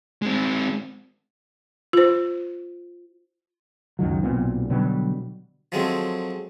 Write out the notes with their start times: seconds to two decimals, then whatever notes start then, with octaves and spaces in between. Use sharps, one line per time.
0.22 G#3 C4
1.93 F4 C5
3.99 C#2 F#2 D#3 F#3
4.23 B1 A#2 B3 C4
4.70 B2 D3 F#3 G3
5.72 F3 F#3 G#3 A3 C4